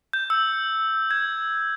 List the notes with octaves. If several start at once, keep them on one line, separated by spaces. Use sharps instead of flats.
G6
E6
G#6